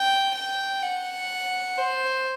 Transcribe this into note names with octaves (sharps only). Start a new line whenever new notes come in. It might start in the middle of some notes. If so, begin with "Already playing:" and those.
Already playing: G5
G5
F#5
C5